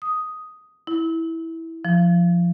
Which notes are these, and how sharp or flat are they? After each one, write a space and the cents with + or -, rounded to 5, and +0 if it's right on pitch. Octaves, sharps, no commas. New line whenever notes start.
D#6 +5
E4 -10
F3 -5